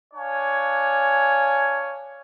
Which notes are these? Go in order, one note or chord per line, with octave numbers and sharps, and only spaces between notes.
D4 C#5 F5 G#5